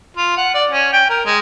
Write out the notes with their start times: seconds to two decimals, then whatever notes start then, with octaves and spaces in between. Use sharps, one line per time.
0.17 F4
0.37 F#5
0.54 D5
0.71 C#4
0.93 G5
1.09 A#4
1.25 G#3